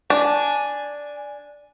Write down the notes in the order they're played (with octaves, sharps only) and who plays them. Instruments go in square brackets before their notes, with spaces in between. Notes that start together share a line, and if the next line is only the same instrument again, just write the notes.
[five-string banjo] D4 [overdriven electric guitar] G#5